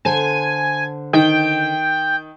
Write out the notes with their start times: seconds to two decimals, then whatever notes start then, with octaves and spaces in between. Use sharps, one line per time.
0.05 D3 C5 G#5 A5
1.13 D#3 G5